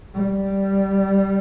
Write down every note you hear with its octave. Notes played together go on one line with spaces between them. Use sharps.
G3